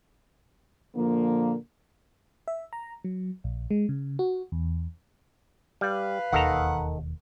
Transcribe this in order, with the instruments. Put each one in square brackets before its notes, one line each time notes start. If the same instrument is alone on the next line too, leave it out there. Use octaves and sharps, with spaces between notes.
[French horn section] A#2 D3 F3 A#3
[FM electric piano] E5
A#5
F#3
A#1
G#3
C#3
F#4
E2
[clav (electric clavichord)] G3 [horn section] B4 F5
[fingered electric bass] E1 D#2 [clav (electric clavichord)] D#3 A4 A#5 [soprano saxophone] F#5